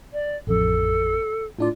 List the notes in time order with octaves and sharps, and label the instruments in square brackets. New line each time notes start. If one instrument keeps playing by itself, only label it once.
[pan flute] D5
[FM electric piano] A1 F2 [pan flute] A4
[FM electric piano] A2 D4 D5 [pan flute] F4